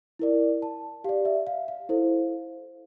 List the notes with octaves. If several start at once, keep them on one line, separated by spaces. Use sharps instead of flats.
E4 A#4 D5
A5
G4 D5 F5
E5
F5
F5
E4 A4 C5